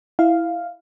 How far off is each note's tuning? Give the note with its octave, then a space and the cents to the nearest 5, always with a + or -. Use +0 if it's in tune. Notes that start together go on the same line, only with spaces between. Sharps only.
E4 +0 F5 +0